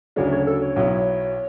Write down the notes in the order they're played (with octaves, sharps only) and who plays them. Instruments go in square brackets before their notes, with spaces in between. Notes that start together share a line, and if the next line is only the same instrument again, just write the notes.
[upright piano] D2 C#3 F#3 A3 D4 [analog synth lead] C#5
[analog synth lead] C#5
A4
C#5
[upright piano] B1 B2 F#3 B3 E4